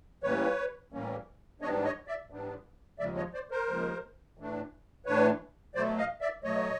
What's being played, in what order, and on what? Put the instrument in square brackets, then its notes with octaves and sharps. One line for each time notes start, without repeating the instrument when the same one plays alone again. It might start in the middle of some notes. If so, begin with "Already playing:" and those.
[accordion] A2 E3 G3 A#3 C#4 B4 C#5
A2 E3 G3 A#3 C#4
G#2 E3 G3 B3 D4 C#5 D#5
C#5 D#5
D5 E5
G#2 E3 G3 B3 D4
D#2 C#3 F3 G#3 D5 E5
C#5 D#5
C5 D5
A#4 C5
D#2 C#3 F3 G#3
A2 E3 A3 D4
A2 E3 A3 D4 B4 C#5
B2 F#3 A3 C5 D5
D#5 F5
D5 E5
B2 F#3 A3 C#5 D#5